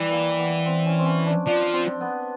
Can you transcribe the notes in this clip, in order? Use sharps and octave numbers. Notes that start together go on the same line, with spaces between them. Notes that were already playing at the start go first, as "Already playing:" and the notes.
Already playing: E3 G3
A#3
B3
C4
C#4
C4
C#4
D4
F3 D4
C4
B3